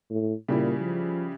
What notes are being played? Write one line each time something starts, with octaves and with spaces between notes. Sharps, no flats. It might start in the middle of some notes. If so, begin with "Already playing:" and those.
A2
A#2 C#3 G3 E4
F3